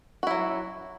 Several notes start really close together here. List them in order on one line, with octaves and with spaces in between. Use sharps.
F#4 E4 F#3